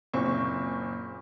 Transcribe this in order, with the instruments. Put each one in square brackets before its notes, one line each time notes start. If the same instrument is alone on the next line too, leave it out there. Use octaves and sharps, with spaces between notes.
[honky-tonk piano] F#1 A#2 C4 C#6